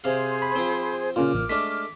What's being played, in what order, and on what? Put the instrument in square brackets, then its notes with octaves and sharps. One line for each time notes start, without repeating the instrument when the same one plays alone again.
[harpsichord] C3 F5 [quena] G#4 [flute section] C5
[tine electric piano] B5
[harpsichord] F3 C4
[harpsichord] A#2 [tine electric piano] C#3 C#4 F4 [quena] D6 [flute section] F6
[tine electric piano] A1
[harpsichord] G#3 A3 D4 [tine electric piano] B6